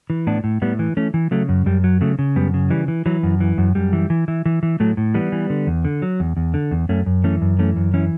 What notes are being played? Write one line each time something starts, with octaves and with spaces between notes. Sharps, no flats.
E3
A2 B3 D4
A2
A2 G3 B3
E3
E3 A3 C#4
E3
C#3 F#3 A3
F#2
F#2 G3
F#3
C#3 F#3 A3
C#3
F#2 G3 B3
C#3
E3 G3
E3
E3 F#3
F#2
E3
F#2
F#2 G3
E3
E3
E3
E3
E3
A2 F#3 A3
A2
E3 G3 B3
E3
D3
E2
D3
F#3
E2
E2
D3
E2
F#2 A3 C#4
F#2
E3 A3 C#4
F#2
E3 A3 C#4
F#2
E3 C#4 E4